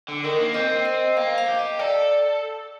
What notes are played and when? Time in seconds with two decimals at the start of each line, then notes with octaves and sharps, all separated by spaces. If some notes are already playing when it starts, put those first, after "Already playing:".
0.08 D3
0.24 D#3 A#4
0.39 A#3
0.54 C4 D#5
0.85 D#5
1.17 A#3 F5
1.38 F5
1.48 G4
1.59 D#5
1.79 A4 D5